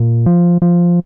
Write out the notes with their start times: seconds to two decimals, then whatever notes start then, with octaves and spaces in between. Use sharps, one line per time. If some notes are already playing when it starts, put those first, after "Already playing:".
Already playing: A#2
0.26 F3
0.62 F3